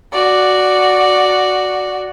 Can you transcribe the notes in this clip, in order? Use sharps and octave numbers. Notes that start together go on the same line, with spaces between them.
F#4 D5